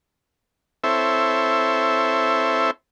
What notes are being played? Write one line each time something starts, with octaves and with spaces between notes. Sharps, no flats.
C4 E4 A4 C5 C#5 E5